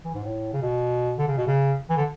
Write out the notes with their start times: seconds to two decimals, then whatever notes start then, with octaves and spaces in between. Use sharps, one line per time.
0.05 E3
0.14 G#2
0.24 A2
0.53 C#3
0.62 B2
1.18 D3
1.28 C#3
1.37 B2
1.47 C#3
1.89 E3
1.96 D3